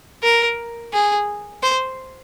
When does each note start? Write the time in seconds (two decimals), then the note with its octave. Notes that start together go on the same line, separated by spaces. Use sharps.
0.23 A#4
0.93 G#4
1.63 C5